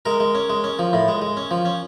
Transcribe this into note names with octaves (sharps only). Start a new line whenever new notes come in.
G#3 A#4
G#3
C#4
G#3
C#4
F3
A2
G#3
G#3
C#4
F3
C#4